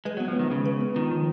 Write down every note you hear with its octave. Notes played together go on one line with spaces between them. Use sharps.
G#3 B4
F#3
B3
F3
D#3 G#3
C#3 G#3
B4
B3
D#3 F4
F3